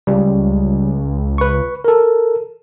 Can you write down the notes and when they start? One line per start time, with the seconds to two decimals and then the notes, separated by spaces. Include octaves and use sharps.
0.07 C#2 G3
1.38 B4 C#6
1.84 A4 A#4